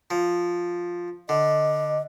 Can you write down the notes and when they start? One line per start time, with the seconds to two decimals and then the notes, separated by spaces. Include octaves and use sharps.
0.10 F3
1.29 D3 D#5